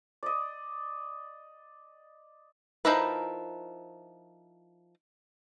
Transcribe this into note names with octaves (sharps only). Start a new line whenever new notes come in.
D5 D#5
F3 D#4 E4 A#4 B4